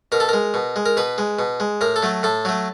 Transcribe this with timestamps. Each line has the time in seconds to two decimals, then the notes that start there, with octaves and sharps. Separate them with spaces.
0.12 B2 A#4
0.20 A4
0.29 G#3 A#4
0.54 B2
0.76 G#3
0.86 A#4
0.97 B2 B4
1.18 G#3
1.39 B2
1.60 G#3
1.81 A2 A#4
1.96 A4
2.02 F#3 A3
2.23 A2 A4
2.45 F#3 A3